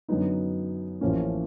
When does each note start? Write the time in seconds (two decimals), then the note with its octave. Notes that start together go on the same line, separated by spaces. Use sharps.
0.09 F#2 D3 F#3 B3 D#4
1.01 A1 A2 F3 A#3 C#4